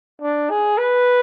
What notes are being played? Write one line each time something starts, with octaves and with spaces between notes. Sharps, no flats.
D4
G#4
B4